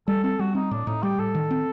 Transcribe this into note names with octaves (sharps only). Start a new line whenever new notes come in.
G3 A4
C4 A4
G3 F#4
C4 D#4
A2 D4
A2 D#4
G3 G4
A2 A4
D#3
C4